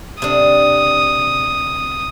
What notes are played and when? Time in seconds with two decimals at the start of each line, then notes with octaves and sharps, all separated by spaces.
0.22 C3 D4 D#6